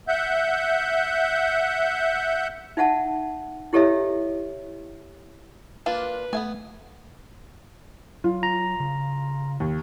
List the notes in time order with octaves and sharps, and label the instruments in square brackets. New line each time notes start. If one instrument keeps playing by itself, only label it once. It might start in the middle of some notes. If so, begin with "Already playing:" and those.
[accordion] E5 F#5 G6
[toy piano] D#4 E5 F#5 A5
E4 G4 A4 C#5 D#5 E5
[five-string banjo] A#3 D4 F4 [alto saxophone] B4
[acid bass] A3 [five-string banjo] B3 F5 G#5
[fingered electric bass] F#3 [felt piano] F4
[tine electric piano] A#5
[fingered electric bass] C#3
[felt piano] D#2